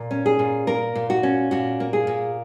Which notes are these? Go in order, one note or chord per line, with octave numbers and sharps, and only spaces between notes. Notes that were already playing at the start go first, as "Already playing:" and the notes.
Already playing: A#2
C#4
G#4
A#2
A#3 A#4
A#2
F#4
C#4
A#2 F#4
A#3
G#4
A#2